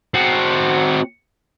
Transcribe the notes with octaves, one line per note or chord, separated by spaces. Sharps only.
C4 F#4